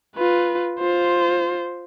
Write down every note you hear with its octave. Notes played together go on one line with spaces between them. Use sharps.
F4 B4
F4 C5